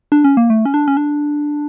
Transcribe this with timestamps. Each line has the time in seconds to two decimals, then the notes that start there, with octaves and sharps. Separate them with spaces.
0.12 D4
0.24 C#4
0.37 A#3
0.50 A3
0.65 C#4
0.74 D4
0.88 C#4
0.97 D4